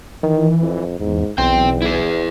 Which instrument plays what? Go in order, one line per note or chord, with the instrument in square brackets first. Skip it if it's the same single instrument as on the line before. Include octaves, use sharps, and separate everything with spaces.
[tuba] D#3 [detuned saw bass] E3
[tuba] F2
[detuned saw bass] E2 [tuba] G#2
[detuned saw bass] B1 [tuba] E2 [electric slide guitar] C4 G5
[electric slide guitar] E4 G#4